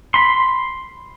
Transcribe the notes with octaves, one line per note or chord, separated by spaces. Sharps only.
B5 C6